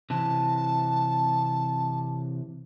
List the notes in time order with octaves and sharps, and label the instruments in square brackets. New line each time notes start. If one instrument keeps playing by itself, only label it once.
[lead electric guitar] C3 E3 [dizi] A5